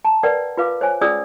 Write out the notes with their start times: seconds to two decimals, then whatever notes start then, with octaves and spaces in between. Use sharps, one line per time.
0.05 A5 A#5
0.23 A#4 B4 D5 F#5 G5
0.57 F4 B4 F5 D6
0.81 C5 C#5 G#5
1.01 C#4 F4 G#4 D5 D#6 E6